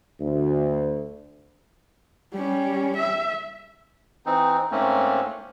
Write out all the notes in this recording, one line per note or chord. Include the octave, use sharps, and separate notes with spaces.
D2
G3 C#4
E5
E3 C4 D#4
G#2 A3 A#3 C4 C#4